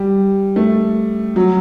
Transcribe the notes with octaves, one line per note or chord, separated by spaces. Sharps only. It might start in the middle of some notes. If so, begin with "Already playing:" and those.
Already playing: G3
A3
F#3